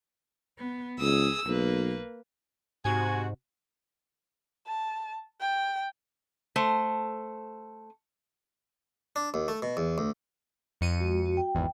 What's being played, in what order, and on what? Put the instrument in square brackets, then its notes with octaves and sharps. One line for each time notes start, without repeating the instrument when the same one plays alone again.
[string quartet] B3
[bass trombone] C#2 [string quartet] G#4 D#6 E6
[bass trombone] B1 [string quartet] A#3 B4
[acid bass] G#2 [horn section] C3 F#4 [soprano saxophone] G#5
[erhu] A5
G5
[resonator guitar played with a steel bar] A3 C5
[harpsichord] D4
D#2
A3
B2
E2
D2
[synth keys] F2 C#7 D#7
[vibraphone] G#3 F#4
F#4
G5
[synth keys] G#1 E2